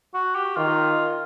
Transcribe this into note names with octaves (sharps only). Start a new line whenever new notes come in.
F#4
G4
D#3 F4